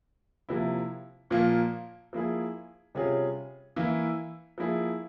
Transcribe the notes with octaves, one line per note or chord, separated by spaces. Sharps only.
C3 F3 A#3 E4
A#2 F3 A#3
F3 A#3 E4 G#4
C3 G3 C#4 F4 G#4
E3 A#3 E4
F3 A#3 E4 G#4